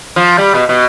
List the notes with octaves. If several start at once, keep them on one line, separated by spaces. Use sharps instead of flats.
F3
G3
B2
B2